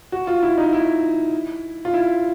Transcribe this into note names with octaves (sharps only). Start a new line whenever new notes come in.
F#4
F4
E4
D#4
E4
F4
E4